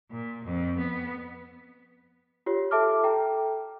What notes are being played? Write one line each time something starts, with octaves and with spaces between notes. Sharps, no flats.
A#2
F2
B3
F4 G4 C#5
A4 E5 A5 D6 F6
A4 G5 A#5